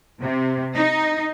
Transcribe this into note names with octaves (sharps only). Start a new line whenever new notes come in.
C3
D#4